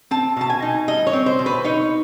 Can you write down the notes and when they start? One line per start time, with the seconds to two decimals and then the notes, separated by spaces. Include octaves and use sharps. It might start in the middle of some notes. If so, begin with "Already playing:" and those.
0.11 C4 A5
0.36 B2 A5
0.50 G#5
0.62 D#4
0.88 G3 D#5
1.07 C#5
1.13 C4
1.26 C5
1.39 B2
1.46 B4
1.64 D#4 C#5